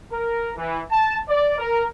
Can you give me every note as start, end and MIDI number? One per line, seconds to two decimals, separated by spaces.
0.12 0.52 70
0.56 0.81 52
0.91 1.17 81
1.29 1.58 74
1.59 1.84 70